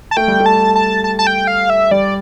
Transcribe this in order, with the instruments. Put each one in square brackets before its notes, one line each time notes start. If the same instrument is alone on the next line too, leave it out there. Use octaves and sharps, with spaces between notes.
[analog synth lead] A5
[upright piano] A3 [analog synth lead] G5
[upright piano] G3
A3
[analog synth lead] A5
A5
A5
A5
G5
F5
E5
[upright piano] G3 [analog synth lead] D5